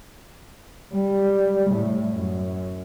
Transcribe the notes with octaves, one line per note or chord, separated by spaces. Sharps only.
G3
A2
F#2